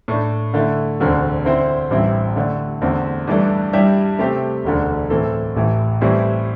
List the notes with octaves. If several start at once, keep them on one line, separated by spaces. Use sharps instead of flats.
A2 A3 D4
D3 A3 E4
E1 D2 D3 C4
D3 C4 E4 C5
A1 G2 E3 C4 E4
D3 A3 D4
E2 D3 A3 C4
G2 E3 A3 D4 A4
G2 G3 E4 G4 E5
C3 A3 C4 G4
E1 D2 D3
A2 E3 C4 A4
A1 A2 E3
A2 E3 G3 C4 E4